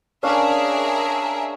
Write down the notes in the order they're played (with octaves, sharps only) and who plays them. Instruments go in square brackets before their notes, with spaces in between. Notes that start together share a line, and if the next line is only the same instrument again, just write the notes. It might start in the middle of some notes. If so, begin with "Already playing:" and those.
[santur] C#4 D4 F5 [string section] G#4 A#4 E5